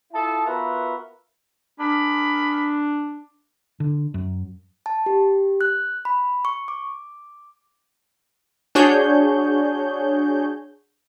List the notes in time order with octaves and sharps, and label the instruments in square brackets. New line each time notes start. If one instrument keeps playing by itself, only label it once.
[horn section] E4 F4 A4 D#5 A5
B3 F4 F#4 A#4 B4 E5
[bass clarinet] D4 [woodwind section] G#4 A#4 B5
[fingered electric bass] D3
F#2
[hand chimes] A5
G4
F#6
B5
C#6
D6
[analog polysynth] D4 F#4 G#4 C#5 G6